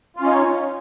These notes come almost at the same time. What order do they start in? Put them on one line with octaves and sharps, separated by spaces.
F4 C#4 D#4 C#5